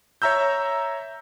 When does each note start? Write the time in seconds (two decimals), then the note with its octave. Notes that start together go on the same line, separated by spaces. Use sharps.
0.22 C#5 E5 A#5 E6 G6